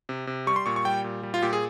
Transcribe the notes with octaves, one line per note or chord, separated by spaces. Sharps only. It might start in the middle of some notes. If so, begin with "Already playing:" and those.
C3
C3
G3 C#6
C6
A#2 C#6
C#6
G3 G5
A#2
G3
F4
A#2 G4
G#4